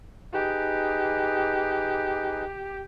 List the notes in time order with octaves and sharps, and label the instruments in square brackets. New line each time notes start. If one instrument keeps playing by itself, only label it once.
[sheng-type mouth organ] D#4 G#4 B4 [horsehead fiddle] G4